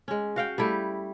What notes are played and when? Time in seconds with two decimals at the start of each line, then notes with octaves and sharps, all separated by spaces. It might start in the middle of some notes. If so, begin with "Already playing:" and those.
0.08 G#3 C#4
0.36 F#4 F5 G5
0.58 G3 A3 E4 G4